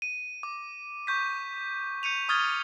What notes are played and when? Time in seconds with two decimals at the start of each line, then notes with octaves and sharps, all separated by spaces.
0.02 D#7
0.43 D6
1.07 C#6 G6 B6
2.03 G6 C#7 D#7 F7
2.29 C#6 D#6 F6 G#6 A6 G7